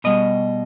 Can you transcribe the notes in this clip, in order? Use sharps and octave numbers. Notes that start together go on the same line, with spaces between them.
B2 G3 D#5